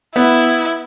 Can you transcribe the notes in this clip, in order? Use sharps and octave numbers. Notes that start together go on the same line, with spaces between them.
B3 E4